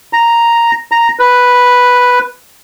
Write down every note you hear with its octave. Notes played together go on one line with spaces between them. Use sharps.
A#5
A#5
B4